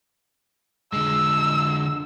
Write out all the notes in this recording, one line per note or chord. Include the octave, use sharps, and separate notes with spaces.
D3 G#3 E6